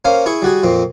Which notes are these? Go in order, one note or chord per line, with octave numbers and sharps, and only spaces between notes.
A#3 C#4 C5 F5
E4 G#4 C#6
G3 F#4 G#4
F2 A#2 C4